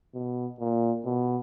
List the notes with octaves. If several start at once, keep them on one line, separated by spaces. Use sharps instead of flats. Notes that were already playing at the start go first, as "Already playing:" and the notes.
B2
A#2
B2